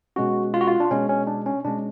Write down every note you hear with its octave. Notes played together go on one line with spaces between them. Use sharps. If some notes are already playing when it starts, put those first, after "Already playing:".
B2 G#3 C#4 F#4
F4
F#4
F4
D4
B2 G#3 C#4
C#4
D4
C#4
B2 G#3 C#4 D4